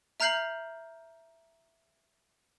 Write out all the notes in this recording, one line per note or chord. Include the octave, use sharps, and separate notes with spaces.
E5 A#5 F6 G6 C7 F#7